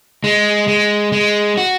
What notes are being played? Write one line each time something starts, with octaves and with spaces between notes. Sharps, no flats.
G#3
G#3
G#3
F#4